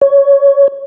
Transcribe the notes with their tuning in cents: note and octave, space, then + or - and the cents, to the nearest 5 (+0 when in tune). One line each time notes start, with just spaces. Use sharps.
C#5 +10